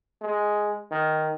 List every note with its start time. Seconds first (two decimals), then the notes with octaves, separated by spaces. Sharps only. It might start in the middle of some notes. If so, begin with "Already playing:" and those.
0.22 G#3
0.91 D#3